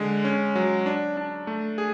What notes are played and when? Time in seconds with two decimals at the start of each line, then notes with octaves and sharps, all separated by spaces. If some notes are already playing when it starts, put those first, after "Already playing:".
Already playing: D3 G#3
0.24 C#4
0.55 F#3
0.86 D4
1.17 D4
1.47 A3
1.78 G#4